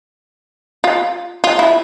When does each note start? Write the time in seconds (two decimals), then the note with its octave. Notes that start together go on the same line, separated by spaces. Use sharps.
0.84 F4
1.44 F4
1.59 E4